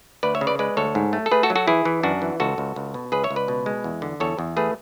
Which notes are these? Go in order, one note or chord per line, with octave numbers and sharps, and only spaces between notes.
D2 B4 D5
C#5 E5
C#3
B4 D5
G#3 B4 D5
D2 A4 C#5
G#2
A3
A4
A3 G#4 B4
F#4 A4
F#3
F#4 A4
E3 E4 G#4
E3
F#2 D4 F#4
E3
C#2 F#4 A4
C#2
C#2
B2
C#2 G#4 B4
C#5 E5
C#2
B4 D5
B2
G#3
E2
D3
E2 A4 C#5
E2
A3 G#4 B4